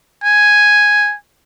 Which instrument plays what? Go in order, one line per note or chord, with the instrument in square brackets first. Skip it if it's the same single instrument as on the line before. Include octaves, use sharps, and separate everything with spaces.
[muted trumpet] G#5